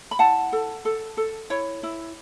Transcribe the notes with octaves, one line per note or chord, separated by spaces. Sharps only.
B5
E4 F#5 A5
A4
A4
A4
E4 C#5
E4